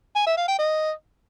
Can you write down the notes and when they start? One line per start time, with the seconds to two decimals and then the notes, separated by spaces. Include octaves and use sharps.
0.15 G#5
0.26 E5
0.37 F5
0.48 G5
0.59 D#5